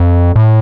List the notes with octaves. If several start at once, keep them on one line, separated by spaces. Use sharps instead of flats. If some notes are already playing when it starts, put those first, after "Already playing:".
Already playing: F2
A2